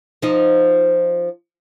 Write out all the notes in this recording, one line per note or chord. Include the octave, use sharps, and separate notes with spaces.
F3 D#4